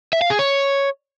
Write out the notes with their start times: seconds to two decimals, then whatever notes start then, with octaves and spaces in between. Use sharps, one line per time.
0.13 E5
0.22 F5
0.30 G#4
0.39 C#5